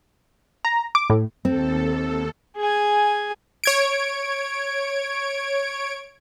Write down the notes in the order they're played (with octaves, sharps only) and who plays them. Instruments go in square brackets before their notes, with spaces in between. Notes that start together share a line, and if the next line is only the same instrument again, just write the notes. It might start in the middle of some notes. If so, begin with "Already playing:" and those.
[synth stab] A#5
D6
A2
[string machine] D#2 A4 [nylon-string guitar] C4
[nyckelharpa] G#4 G#5
[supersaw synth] C#5 G#6 D7